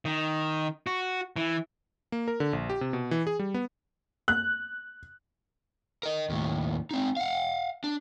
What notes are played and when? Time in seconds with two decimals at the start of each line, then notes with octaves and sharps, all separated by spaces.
0.05 D#3
0.87 F#4
1.36 E3
2.12 A#3
2.28 A#4
2.40 D3
2.53 A#1
2.70 G4
2.81 C3
2.93 B2
3.11 E3
3.27 G#4
3.39 G3
3.54 B3
4.28 F#6
6.03 A#4 D#5
6.30 D#2 A2
6.91 C4 D#4
7.17 F5 F#5
7.84 D4